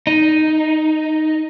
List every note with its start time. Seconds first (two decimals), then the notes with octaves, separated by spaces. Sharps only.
0.07 D#4